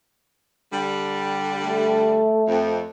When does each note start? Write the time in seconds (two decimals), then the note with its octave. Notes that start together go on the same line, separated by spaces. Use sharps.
0.72 D3 G3
1.63 A3
2.48 F2